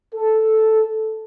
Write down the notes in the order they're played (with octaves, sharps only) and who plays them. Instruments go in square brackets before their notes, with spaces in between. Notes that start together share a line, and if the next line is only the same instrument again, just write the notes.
[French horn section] A4